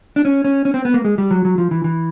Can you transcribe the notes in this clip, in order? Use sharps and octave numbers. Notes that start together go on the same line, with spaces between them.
D4
C#4
C#4
C#4
C4
B3
A#3
G#3
G3
F#3
F#3
F3
E3
E3